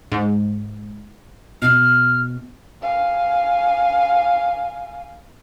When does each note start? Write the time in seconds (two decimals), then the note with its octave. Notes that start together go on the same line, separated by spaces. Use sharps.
0.12 G#2
1.62 B2 F6
2.82 F5 G#5